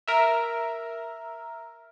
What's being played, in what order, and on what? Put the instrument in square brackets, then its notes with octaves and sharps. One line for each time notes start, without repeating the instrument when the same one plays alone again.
[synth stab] A#4 E5